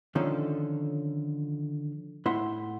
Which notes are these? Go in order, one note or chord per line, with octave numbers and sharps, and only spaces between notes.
D3 D#3 F3 C#4 A4
A2 E4 F#5 C6